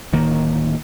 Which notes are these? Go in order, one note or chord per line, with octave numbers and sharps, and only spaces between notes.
D1 D#3 A#3